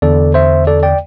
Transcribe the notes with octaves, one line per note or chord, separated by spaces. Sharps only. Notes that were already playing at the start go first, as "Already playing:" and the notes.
E2 D3 A4 D5
C5 E5
A4 D5
D5 G5